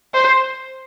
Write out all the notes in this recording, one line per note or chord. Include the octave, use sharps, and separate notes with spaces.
C5